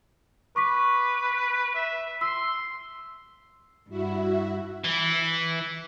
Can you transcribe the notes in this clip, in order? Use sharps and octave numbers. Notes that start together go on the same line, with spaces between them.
B4 C#6 D6 B6
E5
C6 E6
G2 E4 F#4 E5
E3